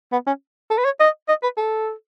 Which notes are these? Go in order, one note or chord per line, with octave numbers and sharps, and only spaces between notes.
B3
C#4
A4
B4
C#5
D#5
D#5
B4
A4